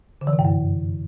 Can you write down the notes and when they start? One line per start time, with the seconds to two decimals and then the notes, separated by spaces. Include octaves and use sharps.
0.21 D3
0.27 E3
0.33 C3
0.39 G2
0.45 F#2